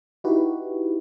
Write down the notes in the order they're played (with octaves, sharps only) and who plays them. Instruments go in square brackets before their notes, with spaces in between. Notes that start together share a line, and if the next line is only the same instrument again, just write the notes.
[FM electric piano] D#4 E4 F#4 G4 B4